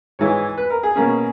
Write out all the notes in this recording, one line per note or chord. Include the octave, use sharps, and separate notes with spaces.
G#2 E3 G#3 C#5
B4
A#4
G#4
B2 A#3 C#4